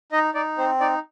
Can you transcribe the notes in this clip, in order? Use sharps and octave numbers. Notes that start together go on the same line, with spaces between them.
D#4 D#5
D#4 D5
C4 C5
D#4 D5